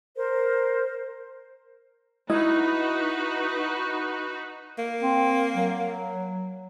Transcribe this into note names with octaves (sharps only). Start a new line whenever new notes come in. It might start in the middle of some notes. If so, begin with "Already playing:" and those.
A#4 C5
D#4 E4 F#4 B4 D#5
A#3
C4
F#3